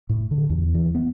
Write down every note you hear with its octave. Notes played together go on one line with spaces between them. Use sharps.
A2
D3
E2
E3
B3